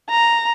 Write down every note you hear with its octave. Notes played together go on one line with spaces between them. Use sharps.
A#5